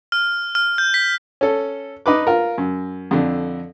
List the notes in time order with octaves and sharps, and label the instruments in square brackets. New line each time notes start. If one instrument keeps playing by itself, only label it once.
[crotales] F6
F6
G6
B6
[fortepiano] C#4 A4
D#4 B4 D6
F4 A#4
F#2
F2 D3